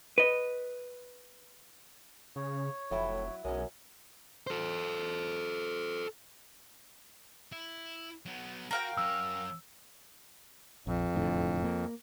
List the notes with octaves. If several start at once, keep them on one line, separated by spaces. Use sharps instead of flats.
B4 D#5
C#3 C#5
F1 A2 F#3 E4
B1 F#2 G#3 C#4
A4 C5
E4
F#3 B3
F#4 A#4 F5 G5
F#2 C#5 E6
A#1 F2
E1 A2 D3
A#3